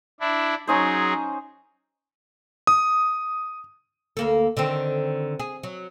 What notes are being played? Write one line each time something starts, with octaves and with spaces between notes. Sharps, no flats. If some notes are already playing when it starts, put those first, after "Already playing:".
D4 E4
F#3 C#4 D#4 G#4 C5
D#6
D2 A#3 A4
D3 D#3 C4
G#4
F#3